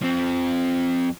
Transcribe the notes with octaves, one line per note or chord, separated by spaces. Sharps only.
F3 C4